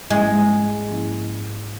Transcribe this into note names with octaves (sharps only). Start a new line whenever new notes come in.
G#2 F3 G#3 A#3 C#4 E4
G#2 F3 A#3 C#4 E4